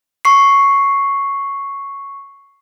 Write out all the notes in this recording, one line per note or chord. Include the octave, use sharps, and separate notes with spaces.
C#6 C7